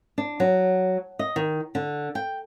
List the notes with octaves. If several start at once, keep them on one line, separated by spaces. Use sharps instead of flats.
D4
F#3
D#5
D#3
D3
G5